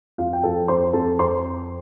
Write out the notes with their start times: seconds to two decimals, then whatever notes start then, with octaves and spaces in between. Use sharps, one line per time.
0.18 F2 F4 F5
0.33 G5
0.43 F3 A4 A5
0.68 F2 C5 C6
0.93 F2 A4 A5
1.19 F2 C5 C6